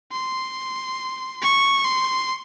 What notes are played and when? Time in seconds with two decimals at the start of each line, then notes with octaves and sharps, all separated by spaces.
0.12 C6
1.42 C#6
1.85 C6